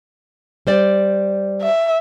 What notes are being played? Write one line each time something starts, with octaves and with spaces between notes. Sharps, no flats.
G3 C5 D5
E5